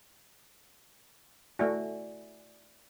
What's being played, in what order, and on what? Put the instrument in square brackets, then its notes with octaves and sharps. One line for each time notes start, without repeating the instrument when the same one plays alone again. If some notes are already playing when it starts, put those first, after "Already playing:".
[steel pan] A3 E4 F#4 [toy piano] D5 E5 G#5